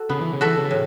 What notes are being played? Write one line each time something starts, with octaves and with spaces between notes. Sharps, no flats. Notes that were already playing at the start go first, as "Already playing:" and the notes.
Already playing: F#4 A4
C#3 B3
E3
C#3
E3 F#4 A4 E5
C#3
A2